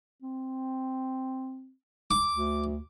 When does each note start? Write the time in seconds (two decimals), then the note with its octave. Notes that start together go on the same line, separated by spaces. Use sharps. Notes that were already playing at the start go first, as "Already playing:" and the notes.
0.22 C4
2.11 D6
2.34 D2